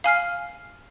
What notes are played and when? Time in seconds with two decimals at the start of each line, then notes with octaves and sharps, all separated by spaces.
0.04 F5 G#5 F6 C7